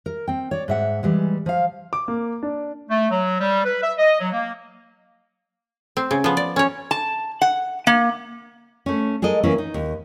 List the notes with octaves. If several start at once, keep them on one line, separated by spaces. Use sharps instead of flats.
A#4
C4 G5
C#5 D5
G#2 E5 F#5
E3 G3 G#3
F3 F5
D6
A#3
D4
A3
F#3
G3
B4
E5
D#5
F#3
A#3
C4
C#3
F3 B3
D5
C#4 C#5
A5
F#5
A#3
A3 C#4
G#3 A4 A#4 D#5
E3 A#3 C#4 E4
D#4
D#2